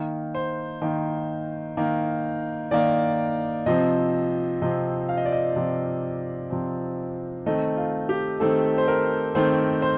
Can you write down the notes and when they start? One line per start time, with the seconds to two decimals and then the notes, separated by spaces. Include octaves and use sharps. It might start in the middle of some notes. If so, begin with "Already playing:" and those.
Already playing: D#3 A#3
0.35 C5
0.82 D#3 A#3
1.77 D#3 A#3
2.71 D#3 A#3 D5
3.66 C3 F3 C4 D#5
4.62 C3 F3 C4 D#5
5.09 F5
5.17 D#5
5.25 D5
5.32 D#5
5.56 C3 F3 C4
6.50 C3 F3 C4
7.46 D#3 A3 C4 D#5
7.77 F4
8.09 G4
8.40 D#3 A3 C4 A4
8.78 C5
8.88 A#4
9.35 D#3 A3 C4 C5
9.82 C5